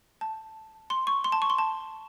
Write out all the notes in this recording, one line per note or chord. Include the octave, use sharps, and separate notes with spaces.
A5
C6
C#6
C6
A5
C#6
C6
A5